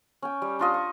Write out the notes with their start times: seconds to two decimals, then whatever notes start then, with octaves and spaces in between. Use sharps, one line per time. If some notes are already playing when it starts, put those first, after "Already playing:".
0.22 C#4 G5
0.42 G3
0.59 D4 F4 D#5
0.74 C#6